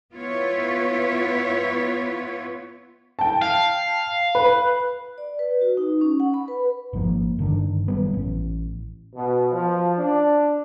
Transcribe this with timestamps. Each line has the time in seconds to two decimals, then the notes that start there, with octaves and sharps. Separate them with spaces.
0.14 B3 E4 F4 B4 C#5
3.19 G5 A5
3.42 F5
4.35 B4
5.18 D5
5.39 B4
5.61 F#4
5.77 D#4
6.01 C#4
6.20 F#5
6.34 B5
6.48 B4
6.93 G#1 G#2 F3 A#3
7.39 G1 D3 D#3 D4
7.88 F#1 F#3 G3 B3
8.14 A1
9.15 B2
9.52 F3
9.97 D4